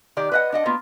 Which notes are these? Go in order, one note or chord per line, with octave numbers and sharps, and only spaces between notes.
D#3 G4 D5
B4 D#5 F#5
D4 D#5 F#5
A#3 B3 F4